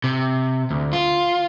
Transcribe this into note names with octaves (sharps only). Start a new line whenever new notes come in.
C3
D2
F4